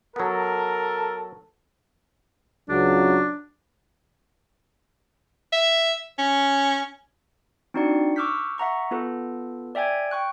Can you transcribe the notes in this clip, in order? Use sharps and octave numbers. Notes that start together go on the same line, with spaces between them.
F#3 B3 A4 A#4
C#2 F#3 D4
E5
C#4
C4 D4 D#4 F#4 D5 C#7
C#6 D6 E6 F6 G6 B6
E5 F#5 A#5 C#6
B3 F4 A4 B4
D5 E5 G5 G#5 G#6
G5 C#6 F#6